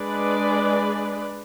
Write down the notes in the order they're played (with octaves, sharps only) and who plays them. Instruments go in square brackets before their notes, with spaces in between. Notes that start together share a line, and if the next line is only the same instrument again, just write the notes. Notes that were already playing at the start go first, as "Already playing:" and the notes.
Already playing: [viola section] G#3 D4 G#4 B4 D5